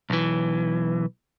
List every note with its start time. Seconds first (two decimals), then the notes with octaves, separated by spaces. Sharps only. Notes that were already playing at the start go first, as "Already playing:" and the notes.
0.10 B1 E3